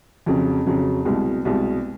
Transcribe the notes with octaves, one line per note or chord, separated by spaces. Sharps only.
F2 C#3 F#3
F2 C#3 F#3
C2 B2 G#3
C2 B2 G#3